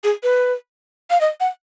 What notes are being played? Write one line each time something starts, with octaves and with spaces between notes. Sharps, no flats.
G#4
B4
F5
D#5
F#5